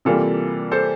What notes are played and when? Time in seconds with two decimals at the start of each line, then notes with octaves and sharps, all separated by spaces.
0.05 C3 E3 G3 A#3 F4 A4
0.71 A4 C5